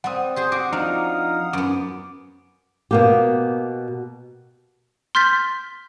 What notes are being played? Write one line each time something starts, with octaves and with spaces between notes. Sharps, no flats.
G3 C4 F#5 D#6
G4 G#4 C5
F#4 D6
F3 D4 D#4 F5
F#2 B3 D6
B2 A#3 G4
C6 F6 G6 A6 B6